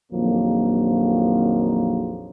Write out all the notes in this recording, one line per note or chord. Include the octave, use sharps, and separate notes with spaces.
A#1 F2 D#3 F3 F#3 A#3